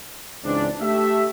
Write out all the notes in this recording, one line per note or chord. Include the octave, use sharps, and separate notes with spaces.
C#2 G#2 E3 C4 D4
A3 G4 E5